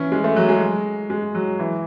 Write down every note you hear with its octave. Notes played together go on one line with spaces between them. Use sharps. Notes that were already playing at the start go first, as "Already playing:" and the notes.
Already playing: E3 C#4
G#3
A3
F#3
G#3
G#3
F#3
E3